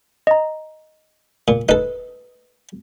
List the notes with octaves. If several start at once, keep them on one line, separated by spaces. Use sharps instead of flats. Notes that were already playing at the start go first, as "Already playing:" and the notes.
D#5 A#5
A#2
D#4 A4 B4